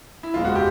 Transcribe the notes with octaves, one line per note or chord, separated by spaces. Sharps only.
E4
F#1 E2 B2 G#3 F4
F#4
G4